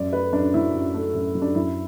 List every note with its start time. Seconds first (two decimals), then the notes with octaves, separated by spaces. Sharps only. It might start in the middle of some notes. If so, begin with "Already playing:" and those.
Already playing: F#2 D5
0.13 A3 B4
0.33 F#2 D4
0.54 F#3 E4
0.74 F#2
0.94 A3
1.15 F#2
1.35 F#3
1.42 D4
1.55 F#2 E4